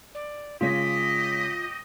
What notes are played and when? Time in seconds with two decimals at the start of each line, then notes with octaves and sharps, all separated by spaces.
0.15 D5
0.61 C#3 G#3 F4 G4 C#5 D#5 B6